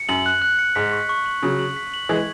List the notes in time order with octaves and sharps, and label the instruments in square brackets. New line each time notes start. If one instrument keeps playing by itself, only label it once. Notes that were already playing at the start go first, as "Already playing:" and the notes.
Already playing: [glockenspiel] C#7
[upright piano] F#2 [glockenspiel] F#7
[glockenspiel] F#6
F#6
C#7
[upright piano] G#2 [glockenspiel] B6
[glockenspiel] C#6
C#6
F#7
[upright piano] C#3 F#3 [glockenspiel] C#6
[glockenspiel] F#7
B6
F#7
[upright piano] E3 G#3 [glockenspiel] G#6